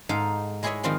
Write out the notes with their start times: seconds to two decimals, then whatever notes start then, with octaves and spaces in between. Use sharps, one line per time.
0.09 G#2 D#4 A4 F5
0.63 G#3 E4 G#4 C#5 D#5 E5
0.83 D#3 F3 G3 C4 F4